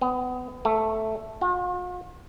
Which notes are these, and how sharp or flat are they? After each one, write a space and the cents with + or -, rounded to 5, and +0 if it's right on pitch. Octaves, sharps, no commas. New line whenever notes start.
B3 +25
A3 +0
F4 +45